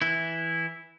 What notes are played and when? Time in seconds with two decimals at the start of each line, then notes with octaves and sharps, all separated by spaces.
0.02 E3 E4